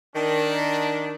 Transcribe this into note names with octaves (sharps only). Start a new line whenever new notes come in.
D#3 D4